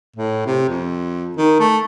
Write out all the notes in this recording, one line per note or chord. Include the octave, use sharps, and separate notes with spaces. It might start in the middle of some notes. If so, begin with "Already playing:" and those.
A2
C3
F2
D#3
A3